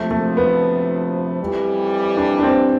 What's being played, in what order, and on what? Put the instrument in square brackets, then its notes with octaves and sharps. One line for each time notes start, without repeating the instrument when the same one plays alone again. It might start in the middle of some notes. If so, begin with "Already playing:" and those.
Already playing: [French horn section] D2 C3 F3 [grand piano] A3
[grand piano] A3
B3
[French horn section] F2 E3 G3
[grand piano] D4
D4
C4